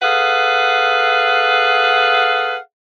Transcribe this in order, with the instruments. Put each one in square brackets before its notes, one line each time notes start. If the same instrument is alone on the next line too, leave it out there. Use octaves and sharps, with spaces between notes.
[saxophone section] G#4 A4 B4 F5 F#5